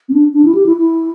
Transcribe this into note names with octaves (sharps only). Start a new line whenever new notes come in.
C4
D4
D4
E4
G4
E4
E4